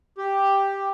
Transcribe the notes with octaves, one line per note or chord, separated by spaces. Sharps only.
G4